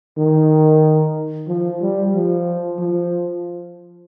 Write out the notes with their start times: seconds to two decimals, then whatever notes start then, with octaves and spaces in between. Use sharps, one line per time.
0.17 D#3
1.48 F3
1.81 G3
2.14 F3
2.79 F3